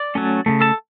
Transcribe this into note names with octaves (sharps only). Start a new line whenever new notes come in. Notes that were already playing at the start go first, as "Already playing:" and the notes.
Already playing: D5 D6
F#3 A3 C#4
C#3 F3 A3
A4 A5